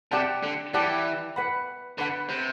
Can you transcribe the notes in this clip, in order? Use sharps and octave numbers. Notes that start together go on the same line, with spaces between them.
C3 G4 D5 F#5 A5
D3
E3 G4 D5 F#5 A5
B4 F#5 B5
D3 B4 F#5 B5
C3